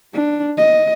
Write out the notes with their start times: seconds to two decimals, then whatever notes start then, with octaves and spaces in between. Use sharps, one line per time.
0.14 D4
0.58 D#5